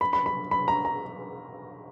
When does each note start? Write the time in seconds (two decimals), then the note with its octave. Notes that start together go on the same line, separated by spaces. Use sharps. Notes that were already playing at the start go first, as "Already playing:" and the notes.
0.01 B5
0.13 B5
0.26 B5
0.51 B5
0.68 A#5
0.85 A#5